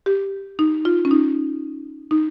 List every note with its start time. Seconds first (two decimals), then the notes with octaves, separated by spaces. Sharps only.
0.06 G4
0.59 D#4
0.85 F4
1.05 C#4
1.11 D#4
2.11 D#4